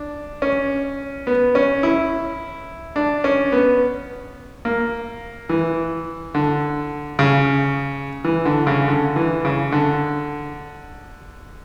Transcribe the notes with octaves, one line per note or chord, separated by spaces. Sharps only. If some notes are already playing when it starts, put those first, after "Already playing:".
Already playing: D4
C#4
B3
C#4
E4
D4
C#4
B3
A#3
E3
D3
C#3
E3
D3
C#3
D3
E3
C#3
D3